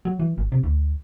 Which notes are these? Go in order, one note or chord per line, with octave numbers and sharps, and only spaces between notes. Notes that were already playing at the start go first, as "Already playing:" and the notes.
F#3
E3
G#1
C3
D2